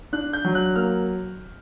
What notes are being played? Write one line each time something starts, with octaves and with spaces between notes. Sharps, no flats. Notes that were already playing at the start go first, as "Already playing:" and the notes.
D4 F#6
G6
F#3
F#6
A#3 F6